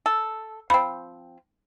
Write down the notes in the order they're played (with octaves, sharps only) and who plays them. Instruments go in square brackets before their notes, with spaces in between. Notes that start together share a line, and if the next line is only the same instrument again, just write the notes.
[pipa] A4
[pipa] F3 C4 [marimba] B5